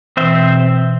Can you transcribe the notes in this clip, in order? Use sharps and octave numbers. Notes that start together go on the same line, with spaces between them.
B2 E3 C4 C5 E5